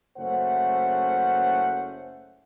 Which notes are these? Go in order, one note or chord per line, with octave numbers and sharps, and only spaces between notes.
F#1 A3 C#4 C5 F#5